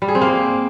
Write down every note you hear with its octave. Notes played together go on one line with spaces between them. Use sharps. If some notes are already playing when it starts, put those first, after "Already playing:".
G3
G#4
C4
A#3